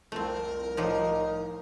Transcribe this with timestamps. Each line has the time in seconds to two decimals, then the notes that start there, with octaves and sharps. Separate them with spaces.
0.12 C2 F2 A3 C4 A#4
0.77 A2 F3 G3 D#4